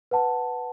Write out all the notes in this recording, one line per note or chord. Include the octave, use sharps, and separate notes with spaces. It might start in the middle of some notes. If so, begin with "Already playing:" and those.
B4 F#5 A5